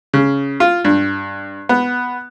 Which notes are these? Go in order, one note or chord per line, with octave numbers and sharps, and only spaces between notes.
C#3
F4
G2
B3